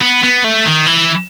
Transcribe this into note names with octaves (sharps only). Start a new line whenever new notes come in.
B3
B3
A3
D#3
E3